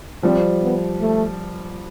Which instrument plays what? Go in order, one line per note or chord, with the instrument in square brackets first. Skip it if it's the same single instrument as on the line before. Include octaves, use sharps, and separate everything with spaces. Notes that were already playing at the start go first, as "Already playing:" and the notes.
[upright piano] F3 G3 [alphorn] C4
[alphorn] B3
A3